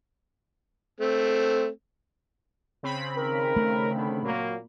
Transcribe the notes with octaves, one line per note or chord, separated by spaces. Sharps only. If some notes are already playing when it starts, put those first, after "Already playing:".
A3 C4
C#3 C4 B5
D#3 A#4
A3
D3 D#3
A#2 F#3 A#3